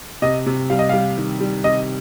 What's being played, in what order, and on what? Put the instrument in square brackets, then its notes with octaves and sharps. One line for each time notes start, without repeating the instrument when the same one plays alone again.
[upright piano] C3 [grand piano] D#5
[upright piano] C3
[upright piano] G3 [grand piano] F5
[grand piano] D#5
[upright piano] G3 [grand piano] F5
[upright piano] D#3
G3
[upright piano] C3 [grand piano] D#5